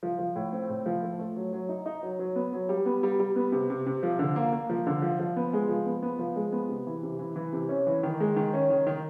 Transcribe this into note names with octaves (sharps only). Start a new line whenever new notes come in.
F3
F3
A2
C4
A2
F3
A3
A3
F#3
F#3
D#4
D#4
F#3
F#3
B3
F#3
G3
B3
G3
G3
B3
C3
C3
C3
F3
D3
A#3
A#3
F3
D3
F3
F3
B3
G#3
F3
B3
B3
F3
G#3
B3
C3
E3
C3
E3
E3
C3
C#4
E3
D#3
G#3
D#3
C#4
D#3
D#3